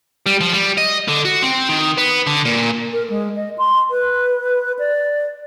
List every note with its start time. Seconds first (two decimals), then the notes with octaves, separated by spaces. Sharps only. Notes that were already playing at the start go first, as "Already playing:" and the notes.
0.26 G3
0.41 F3
0.53 G3
0.78 D#5
1.08 D3
1.25 F#4
1.43 C4
1.69 D#3
1.98 B3
2.27 D3
2.45 A#2
2.93 A#4
3.10 G#3
3.36 D#5
3.58 C6
3.91 B4
4.79 D5